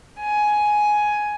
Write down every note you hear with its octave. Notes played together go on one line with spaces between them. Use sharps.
G#5